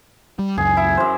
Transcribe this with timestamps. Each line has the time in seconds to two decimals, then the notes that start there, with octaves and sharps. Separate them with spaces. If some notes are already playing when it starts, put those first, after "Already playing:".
0.39 G3
0.58 C#2 F#2 G#4
0.77 E4
0.97 F#2 C5